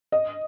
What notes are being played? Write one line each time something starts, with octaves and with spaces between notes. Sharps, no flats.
D#5